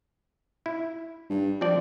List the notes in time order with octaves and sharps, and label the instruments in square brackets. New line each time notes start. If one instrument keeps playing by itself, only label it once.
[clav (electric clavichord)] E4
[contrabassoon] G2
[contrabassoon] F3 [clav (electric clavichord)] C4 D4 D5